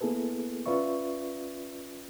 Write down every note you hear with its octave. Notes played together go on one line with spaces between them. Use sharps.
A#3 B3 E4 G#4 A4 B4
C#4 F4 B4 D5 E5 C#6